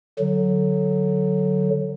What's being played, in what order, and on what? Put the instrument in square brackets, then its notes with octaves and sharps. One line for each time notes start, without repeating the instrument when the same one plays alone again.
[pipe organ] D3 F#3